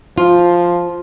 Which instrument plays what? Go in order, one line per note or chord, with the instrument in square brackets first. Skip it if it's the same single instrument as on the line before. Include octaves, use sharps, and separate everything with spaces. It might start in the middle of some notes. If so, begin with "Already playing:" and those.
[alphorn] F3 [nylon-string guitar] F4